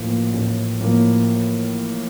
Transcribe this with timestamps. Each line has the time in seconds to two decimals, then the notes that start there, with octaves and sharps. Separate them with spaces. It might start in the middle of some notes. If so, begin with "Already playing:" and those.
Already playing: A1 A2 F3 A#3
0.34 A1
0.80 A2 F3 A#3